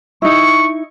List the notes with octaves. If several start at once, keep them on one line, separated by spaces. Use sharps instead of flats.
D#4 E4 C#6